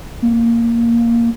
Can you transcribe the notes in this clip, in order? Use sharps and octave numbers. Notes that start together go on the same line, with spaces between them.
A#3